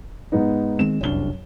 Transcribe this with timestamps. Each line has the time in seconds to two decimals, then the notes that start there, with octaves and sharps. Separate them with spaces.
0.32 G#2 B3 D#4
0.79 D#3 G#3 C4 E7
1.01 F1 C2 F#2 D4 G7